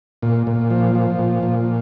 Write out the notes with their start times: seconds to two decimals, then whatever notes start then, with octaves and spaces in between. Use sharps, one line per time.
0.22 A#2
0.47 A#2
0.70 F3
0.95 F3
1.19 A#2
1.43 A#2